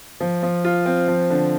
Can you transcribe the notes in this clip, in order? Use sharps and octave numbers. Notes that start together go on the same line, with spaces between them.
F3
F3
F4
C4
F3
D3